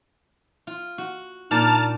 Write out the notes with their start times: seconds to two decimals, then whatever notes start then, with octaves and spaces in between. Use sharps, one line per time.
0.67 F4
0.98 F#4
1.51 A#2 D4 D#4 A5 F6